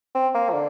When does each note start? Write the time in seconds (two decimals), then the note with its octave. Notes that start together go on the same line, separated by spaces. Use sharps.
0.15 C4
0.34 A#3
0.49 F3
0.53 D3